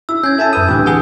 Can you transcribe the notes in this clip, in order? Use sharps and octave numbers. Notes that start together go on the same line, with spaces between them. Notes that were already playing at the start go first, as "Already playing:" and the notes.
E4 E6
C#4 G6 G#6
A4 E5 G#5 A5
F#2 B4 D#6
D2 E3 C4 G4
G#4 F#5